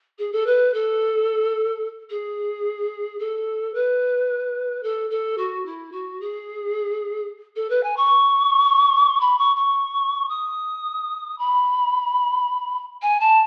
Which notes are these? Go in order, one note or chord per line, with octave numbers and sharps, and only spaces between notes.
G#4
A4
B4
A4
G#4
A4
B4
A4
A4
F#4
E4
F#4
G#4
A4
B4
G#5
C#6
B5
C#6
C#6
D#6
B5
G#5
A5